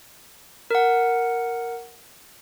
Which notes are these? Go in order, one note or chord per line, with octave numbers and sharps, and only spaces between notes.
A#4 F#5